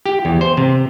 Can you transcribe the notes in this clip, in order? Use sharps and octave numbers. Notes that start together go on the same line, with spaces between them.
G4
E2
C5
C3